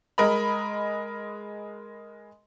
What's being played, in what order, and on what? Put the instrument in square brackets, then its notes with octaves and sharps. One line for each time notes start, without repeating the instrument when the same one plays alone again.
[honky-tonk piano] G#3 A#4 D#5 B5